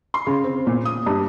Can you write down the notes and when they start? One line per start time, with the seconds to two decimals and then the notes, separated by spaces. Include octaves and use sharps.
0.14 C6
0.27 C#3
0.44 C4
0.67 A#2
0.85 D#6
1.06 G2